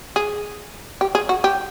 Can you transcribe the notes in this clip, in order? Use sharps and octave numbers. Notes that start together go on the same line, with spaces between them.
G#4
G4
G#4
F#4
G4